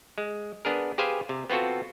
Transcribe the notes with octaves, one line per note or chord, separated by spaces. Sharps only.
G#3
B3 D4 G#4 A#4
G4 G#4 B4 C5 F5 G#5
C3
B3 C4 F4 F#4 A4